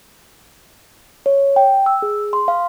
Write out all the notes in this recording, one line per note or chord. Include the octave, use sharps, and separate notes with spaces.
C#5
G5
E6
G#4
C6
F5